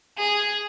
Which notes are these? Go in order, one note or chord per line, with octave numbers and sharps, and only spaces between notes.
G#4